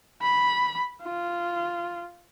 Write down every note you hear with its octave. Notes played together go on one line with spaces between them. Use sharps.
B5
F4